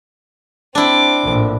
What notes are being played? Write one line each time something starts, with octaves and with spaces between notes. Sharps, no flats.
C4 D4 E4 D6
A#1 A2